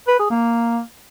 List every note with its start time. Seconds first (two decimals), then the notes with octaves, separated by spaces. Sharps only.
0.08 B4
0.19 G#4
0.31 A#3